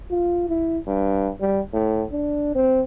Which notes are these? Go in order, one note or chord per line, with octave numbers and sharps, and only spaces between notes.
F4
E4
G2
G3
A2
D4
C4